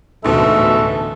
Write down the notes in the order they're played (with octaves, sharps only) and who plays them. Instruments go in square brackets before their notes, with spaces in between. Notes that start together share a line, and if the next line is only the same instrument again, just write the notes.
[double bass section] A1 D2 [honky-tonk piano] G#2 B2 [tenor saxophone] A4 [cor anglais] E5